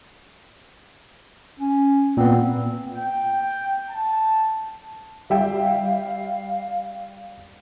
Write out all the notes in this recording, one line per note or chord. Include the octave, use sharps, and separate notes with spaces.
C#4
A#2 B3 C4
G5
A5
G3 E5 F5 G5